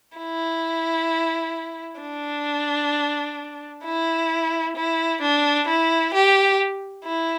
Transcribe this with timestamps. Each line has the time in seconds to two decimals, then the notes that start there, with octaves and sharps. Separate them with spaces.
0.18 E4
2.01 D4
3.84 E4
4.76 E4
5.21 D4
5.67 E4
6.14 G4
7.05 E4